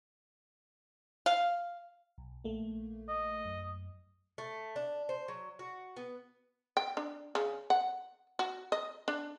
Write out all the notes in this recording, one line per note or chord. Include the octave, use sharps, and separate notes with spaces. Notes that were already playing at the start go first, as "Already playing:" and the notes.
F5
B1
A#1 A3 A#3
D#5
F#2
A3
D4
C5
F#3
F#4
B3
G5
D4
C#3
F#5
F#4
D#5
D4